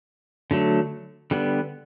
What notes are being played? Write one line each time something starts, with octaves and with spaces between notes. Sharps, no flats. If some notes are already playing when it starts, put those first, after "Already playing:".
D3 F#3 A3
D3 G3 B3